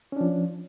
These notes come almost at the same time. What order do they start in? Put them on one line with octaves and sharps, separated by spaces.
C#4 D4 F3